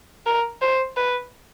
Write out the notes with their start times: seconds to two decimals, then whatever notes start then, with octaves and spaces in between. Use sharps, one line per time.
0.26 A#4
0.62 C5
0.96 B4